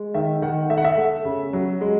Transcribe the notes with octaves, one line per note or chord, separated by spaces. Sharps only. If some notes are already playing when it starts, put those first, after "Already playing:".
Already playing: G#3
D#3 E5
D#3 F#5
A3 E5
F#5
E5
A3
C#3
F#3
G#3